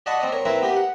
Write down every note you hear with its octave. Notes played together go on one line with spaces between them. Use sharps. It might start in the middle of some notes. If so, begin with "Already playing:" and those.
D5 D#5 F#5 A5 B5 C#6
C4 D5 D#5
A#4 C#5
C4 E4 A#4 B4 E5
B3 G4 A#4
F#5